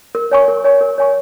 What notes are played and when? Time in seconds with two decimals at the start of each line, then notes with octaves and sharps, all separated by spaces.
0.15 A#4
0.31 C#5 G#5 C#6
0.48 A#4
0.64 C#5 G#5 C#6
0.81 A#4
0.98 C#5 G#5 C#6